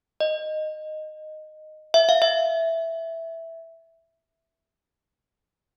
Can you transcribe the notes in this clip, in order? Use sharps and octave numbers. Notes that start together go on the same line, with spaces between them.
D#5
E5
F5
E5